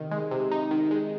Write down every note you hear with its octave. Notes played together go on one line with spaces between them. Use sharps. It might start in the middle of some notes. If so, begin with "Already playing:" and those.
Already playing: C3 D#3 D#4
G#3
C3
D#4
D#3
G#3